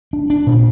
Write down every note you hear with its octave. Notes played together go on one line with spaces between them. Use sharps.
D4
D4
A#2